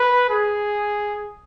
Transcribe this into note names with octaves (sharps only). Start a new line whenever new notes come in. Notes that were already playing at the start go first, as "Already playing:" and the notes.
Already playing: B4
G#4